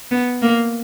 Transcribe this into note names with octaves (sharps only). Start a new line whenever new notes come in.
B3
A#3